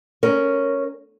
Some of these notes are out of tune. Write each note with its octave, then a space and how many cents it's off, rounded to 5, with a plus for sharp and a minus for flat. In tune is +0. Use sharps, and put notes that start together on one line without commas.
C#4 +0 A#4 -5